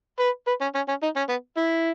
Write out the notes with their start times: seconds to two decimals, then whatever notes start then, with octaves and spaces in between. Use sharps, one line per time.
0.20 B4
0.47 B4
0.61 C#4
0.75 C#4
0.88 C#4
1.03 D#4
1.16 C#4
1.29 B3
1.57 E4